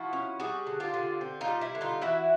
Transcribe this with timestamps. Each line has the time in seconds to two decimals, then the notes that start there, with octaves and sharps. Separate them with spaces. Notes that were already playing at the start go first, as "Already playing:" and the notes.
Already playing: F3 E4 F#4
0.13 C#4
0.40 G3 F#4 G#4
0.67 D3
0.80 F4 G4
0.94 D3
1.21 C4
1.41 D#4 F4
1.48 G3
1.61 E4
1.75 D3
1.81 D#4 F4
2.01 E3 E4 F#4